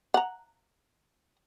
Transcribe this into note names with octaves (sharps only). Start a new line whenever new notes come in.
F#5 A#5